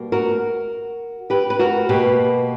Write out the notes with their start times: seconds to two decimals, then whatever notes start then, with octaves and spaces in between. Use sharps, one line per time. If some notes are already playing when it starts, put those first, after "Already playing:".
Already playing: B2 G3 A#3
0.12 F#4 A#4
1.30 G4 B4
1.50 B4
1.59 F#4 A#4
1.89 B2 A#3 G4 B4